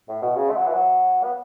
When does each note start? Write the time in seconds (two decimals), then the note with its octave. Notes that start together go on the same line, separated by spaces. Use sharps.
0.09 A2
0.22 B2
0.36 C#3
0.50 A3
0.57 F#3
0.66 E3
0.73 F#3
1.24 B3